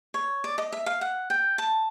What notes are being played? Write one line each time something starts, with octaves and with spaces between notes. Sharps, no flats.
C#5
D5
D#5
E5
F5
F#5
G5
A5